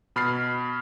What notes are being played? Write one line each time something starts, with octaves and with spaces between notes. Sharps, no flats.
B2 B5 F6 A6 C7